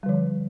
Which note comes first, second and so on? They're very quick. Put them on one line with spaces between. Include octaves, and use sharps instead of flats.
G3 D3 F3